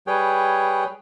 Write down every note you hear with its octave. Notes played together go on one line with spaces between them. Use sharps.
G3 G#4 B4 C#5 G5